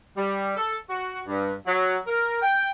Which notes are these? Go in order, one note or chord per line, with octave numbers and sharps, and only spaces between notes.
G3
A4
F#4
G2
F#3
A#4
G5